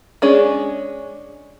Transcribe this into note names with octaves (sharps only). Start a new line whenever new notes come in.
G#3 C#4 D4 G#4